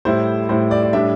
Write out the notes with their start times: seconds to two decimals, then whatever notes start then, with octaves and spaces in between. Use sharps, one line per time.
0.05 A2 G3 E4 C5
0.49 A2 G3 E4 C5
0.71 D5
0.83 D5
0.93 A2 G3 D4 E5